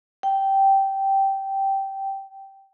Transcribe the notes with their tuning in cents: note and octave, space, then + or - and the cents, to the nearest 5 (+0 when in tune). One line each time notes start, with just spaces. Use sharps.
G5 -10